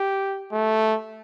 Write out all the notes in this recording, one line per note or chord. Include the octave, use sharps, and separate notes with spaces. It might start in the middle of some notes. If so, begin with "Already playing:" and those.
Already playing: G4
A3